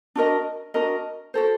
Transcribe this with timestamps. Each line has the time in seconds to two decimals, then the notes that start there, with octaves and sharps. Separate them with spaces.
0.16 D4 F#4 A#4 D#5
0.74 D4 F#4 A#4 D#5
1.34 F#4 A4 C5